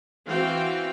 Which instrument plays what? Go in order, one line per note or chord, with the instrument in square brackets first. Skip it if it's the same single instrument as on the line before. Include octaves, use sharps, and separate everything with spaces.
[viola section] E3 C4 F#4 F5 G5